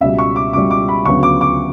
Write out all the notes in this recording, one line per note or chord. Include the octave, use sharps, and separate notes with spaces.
C#2 B2 G3 E5
C#6
D6
C#2 B2 G3 D6
D6
B5
D2 C#3 F#3 B3 C#6
D6
D6